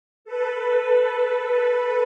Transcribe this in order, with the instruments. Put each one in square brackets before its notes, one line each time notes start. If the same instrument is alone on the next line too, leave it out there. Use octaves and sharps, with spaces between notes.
[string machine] A4 B4